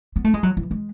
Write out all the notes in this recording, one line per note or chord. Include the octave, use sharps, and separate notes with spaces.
B3
A3
G#3
F#3
E3
G#3